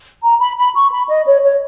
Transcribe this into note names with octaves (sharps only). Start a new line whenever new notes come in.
A#5
B5
B5
C#6
B5
D#5
C#5
C#5